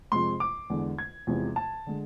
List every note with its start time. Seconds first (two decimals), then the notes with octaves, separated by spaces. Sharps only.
0.12 F2 C3 G#3 C6
0.40 D6
0.70 E2 D3 G#3
0.99 G#6
1.27 E2 C3 F3 G#3
1.56 A5
1.87 D3 G#3